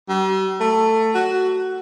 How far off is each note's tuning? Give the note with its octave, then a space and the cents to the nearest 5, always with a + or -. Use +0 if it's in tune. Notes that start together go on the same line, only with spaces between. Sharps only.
G3 -45
A3 +15
F#4 +15